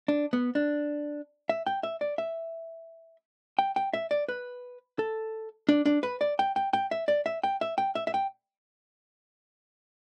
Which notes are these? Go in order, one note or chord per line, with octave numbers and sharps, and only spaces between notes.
D4
B3
D4
E5
G5
E5
D5
E5
G5
G5
E5
D5
B4
A4
D4
D4
B4
D5
G5
G5
G5
E5
D5
E5
G5
E5
G5
E5
E5
G5